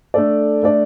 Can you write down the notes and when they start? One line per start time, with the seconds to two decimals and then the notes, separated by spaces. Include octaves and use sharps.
0.14 A3 D4 A4 D5
0.63 A3 D4 A4 D5